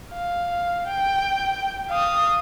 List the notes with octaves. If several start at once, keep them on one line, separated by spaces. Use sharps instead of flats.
F5
G5
F5 D#6